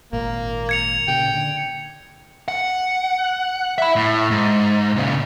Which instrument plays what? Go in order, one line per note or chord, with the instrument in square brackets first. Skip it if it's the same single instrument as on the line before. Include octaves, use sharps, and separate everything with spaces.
[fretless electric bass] G#1 A#2 [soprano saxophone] A#3
[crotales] G#6 C#7 F7
[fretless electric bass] A#2 C#3 [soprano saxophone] G5
[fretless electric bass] D3
[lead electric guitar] F#5
E5 B5
A2
G#2
A#2 C#3